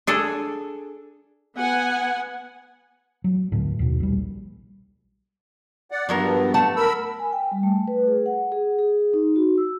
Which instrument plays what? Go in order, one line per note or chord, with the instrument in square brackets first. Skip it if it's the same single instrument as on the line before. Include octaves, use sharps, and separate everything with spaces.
[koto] D4 G#4 A4
[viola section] B3 F#5 G#5
[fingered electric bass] F#3
D2 A2 D3
D#2 B2
A#1 G3
[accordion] D5 F#5
[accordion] G2 B3 [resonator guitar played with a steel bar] F3 F#3 A#4
[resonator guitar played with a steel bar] A3 F#5 A5
[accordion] A#4 B5 E6
[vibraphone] G#5
G5
G3
A3
B4
G#4
F#5
G#4
G#4
D#4
F#4
E6